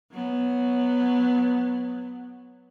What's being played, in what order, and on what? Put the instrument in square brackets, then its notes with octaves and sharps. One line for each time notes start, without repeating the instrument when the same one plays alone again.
[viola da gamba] F#3 B3